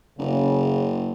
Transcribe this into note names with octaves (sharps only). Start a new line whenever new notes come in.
F#1 C#3